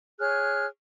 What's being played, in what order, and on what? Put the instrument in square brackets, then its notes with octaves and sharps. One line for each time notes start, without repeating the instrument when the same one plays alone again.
[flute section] G#4 C#5 F6 F#6